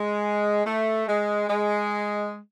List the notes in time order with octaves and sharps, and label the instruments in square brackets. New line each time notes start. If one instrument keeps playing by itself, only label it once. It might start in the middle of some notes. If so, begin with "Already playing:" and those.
Already playing: [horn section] G#3
A3
G#3
G#3